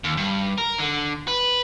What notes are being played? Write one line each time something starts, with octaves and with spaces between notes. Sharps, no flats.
D#2
G2
A#4
D3
B4